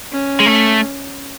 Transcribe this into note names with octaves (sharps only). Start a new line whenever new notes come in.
C#4
G#3
A3